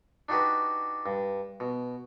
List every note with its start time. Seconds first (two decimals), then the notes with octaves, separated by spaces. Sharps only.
0.29 D4 D#4 F#4 G4 B4
1.06 G2
1.60 B2